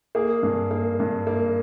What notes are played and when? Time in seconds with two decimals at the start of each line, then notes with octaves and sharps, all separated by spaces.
0.15 A#3 G#4
0.43 G2
0.71 A#3
1.00 G2
1.27 A#3